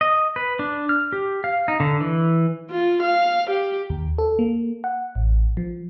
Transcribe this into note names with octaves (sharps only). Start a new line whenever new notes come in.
D#5
B4
D4
F6
G4
F5
D#4
D3
E3
F4
F5
G4
D#2
A4
A#3
F#5
A1
F3